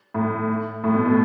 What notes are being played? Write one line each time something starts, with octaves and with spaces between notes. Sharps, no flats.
A2
A2
B2
B2